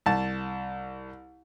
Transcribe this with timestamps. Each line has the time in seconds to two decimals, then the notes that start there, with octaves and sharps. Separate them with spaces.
0.06 C2 A5